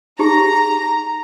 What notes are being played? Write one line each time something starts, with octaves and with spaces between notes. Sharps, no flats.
D#4 G4 G#4 A#5